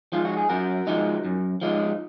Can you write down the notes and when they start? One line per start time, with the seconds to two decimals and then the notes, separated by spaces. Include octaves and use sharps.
0.12 F3 G#3 D#4 F4
0.25 F#4
0.37 G#4
0.49 F#2 F#4 A#4
0.87 F3 G#3 D#4
1.25 F#2
1.61 F3 G#3 D#4